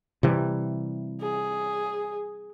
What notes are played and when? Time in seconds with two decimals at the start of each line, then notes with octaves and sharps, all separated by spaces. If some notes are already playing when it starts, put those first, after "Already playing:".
0.23 C3 E3 G3
1.21 G#4